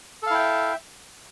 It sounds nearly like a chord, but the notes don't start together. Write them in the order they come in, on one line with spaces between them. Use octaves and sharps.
A4 F5 E4 G5 E5